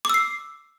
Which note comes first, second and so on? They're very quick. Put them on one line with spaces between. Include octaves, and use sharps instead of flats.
D6 E6 C7